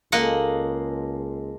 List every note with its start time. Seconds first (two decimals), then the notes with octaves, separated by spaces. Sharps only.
0.12 C#2 G#3 A#3 A4 D#5 F#5 C6